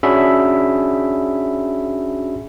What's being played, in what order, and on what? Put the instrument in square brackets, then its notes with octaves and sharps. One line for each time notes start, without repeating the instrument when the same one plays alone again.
[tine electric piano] C#4 D4 F#4 G#4 E5 B5